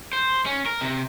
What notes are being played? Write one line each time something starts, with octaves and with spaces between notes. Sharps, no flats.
C5
C#4
A#4
C3